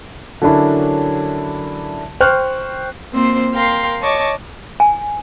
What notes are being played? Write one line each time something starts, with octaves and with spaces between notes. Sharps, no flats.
D3 F#3 C#4 D4 E4 A#4
C5 G5 C#6 F6 F#6
A#3 C4 F4 C5
A#4 F5 G5 C6
C#5 D#5 A5 C#6 D6
G#5